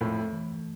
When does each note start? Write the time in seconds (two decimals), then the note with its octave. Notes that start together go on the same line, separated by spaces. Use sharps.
0.01 F2 A2 A3
0.33 E3